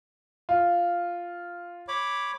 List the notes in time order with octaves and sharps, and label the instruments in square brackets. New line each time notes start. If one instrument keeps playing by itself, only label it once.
[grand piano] F4
[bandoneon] C#5 B5 D6